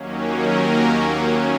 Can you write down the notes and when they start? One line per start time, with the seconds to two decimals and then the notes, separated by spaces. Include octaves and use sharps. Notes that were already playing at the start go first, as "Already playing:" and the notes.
Already playing: D#2 D#3 F#3 A#3 C#4
0.20 A#4